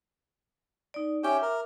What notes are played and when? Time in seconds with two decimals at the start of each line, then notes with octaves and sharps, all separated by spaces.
0.94 D#4 D5
1.24 C#4 G4 E5 G5 D6
1.42 A#4